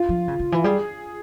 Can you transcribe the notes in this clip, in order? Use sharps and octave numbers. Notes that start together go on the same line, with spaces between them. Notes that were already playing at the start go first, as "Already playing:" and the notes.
Already playing: F4
F3
C#3
C#3
E3
G3 G#4